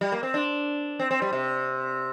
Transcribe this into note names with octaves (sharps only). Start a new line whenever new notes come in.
G3
A#3
C4
D4
C4
C4
G3
C3